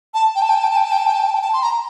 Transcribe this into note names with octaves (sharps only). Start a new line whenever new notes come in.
A5
G5
A5
G5
A5
G5
A5
G5
A5
G5
A5
G5
A5
G5
A5
G5
A5
C6
A#5